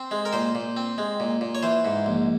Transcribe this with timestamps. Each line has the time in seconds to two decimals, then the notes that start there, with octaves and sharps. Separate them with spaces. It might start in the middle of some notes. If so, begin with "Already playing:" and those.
Already playing: C4 C5
0.11 G#3
0.25 A#4
0.33 A#2 C5
0.55 A#2
0.77 C4
0.98 G#3
1.20 A#2
1.41 A#2
1.55 C#5
1.63 E3 C5
1.85 G#2
2.06 A#1